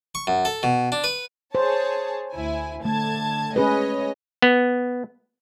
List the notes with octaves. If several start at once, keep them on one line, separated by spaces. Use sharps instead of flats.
C#6
F#2
A4
B2
D4
B4
G#4 C5 C#5 A5
D2 E4 G#5
D3 A3 A5 G#6
G#3 C#4 G#4 B4 C#5 D#5
B3